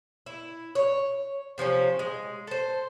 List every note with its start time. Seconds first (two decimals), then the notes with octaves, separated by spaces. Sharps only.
0.26 E4
0.75 C#5
1.58 C3 F3 C4 C#4
1.99 G#3
2.47 A4 C5